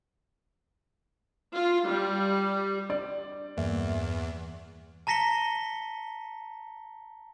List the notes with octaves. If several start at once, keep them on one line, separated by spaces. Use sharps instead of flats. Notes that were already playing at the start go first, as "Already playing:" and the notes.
F4
G3
D4 D5
E2 G2 A#3 E5
A5 A#5 A#6 B6 C#7 G7